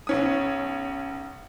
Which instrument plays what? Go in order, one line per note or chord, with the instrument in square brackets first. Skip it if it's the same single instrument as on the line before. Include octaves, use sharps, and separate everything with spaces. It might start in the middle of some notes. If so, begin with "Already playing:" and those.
[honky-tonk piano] B1 C#4 D#6